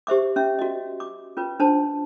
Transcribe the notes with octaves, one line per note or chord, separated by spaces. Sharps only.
G4 C5 E5 D6
C#4 E5
F#4 D#5
D6
C#4 F4 B4
D4 C5 A5